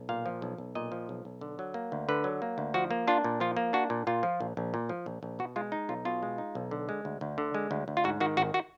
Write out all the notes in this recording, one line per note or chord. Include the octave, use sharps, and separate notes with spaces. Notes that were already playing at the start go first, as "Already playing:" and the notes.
Already playing: B1
A#2 F5
F3
B1
B1
A#2 D#5
F3
B1
B1
D3
F#3
A#3
D2
D3 B4
F#3
A#3
D2
F3 F#4
A#3
D4 F4
A#2
F3 F4
A#3
D4 F#4
A#2
A#2 F4
F3
A#1
A#1
A#2
F3
A#1
A#1
B2 F#4
G#3 F4
D#4
B1 F4
B2 F4
G#3
D#4
B1
D3
G#3
D2
D2
D3
G#3
D2
D2
F4
G#2 F#4
D#3 F#4
G#1 F#4
F#4